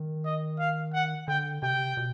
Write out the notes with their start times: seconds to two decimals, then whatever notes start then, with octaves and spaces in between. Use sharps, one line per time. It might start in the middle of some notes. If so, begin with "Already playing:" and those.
Already playing: D#3
0.25 D#5
0.59 F5
0.94 F#5
1.28 D3 G5
1.62 C3 G5
1.97 B2